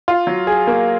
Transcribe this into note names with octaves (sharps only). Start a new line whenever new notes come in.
F4
F#3
G#4
A#3